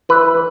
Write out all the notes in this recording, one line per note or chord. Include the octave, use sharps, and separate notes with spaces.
E3 B4